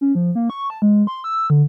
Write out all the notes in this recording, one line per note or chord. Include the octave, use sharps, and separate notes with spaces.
C#4
F3
A#3
C#6
A5
G#3
C6
E6
D3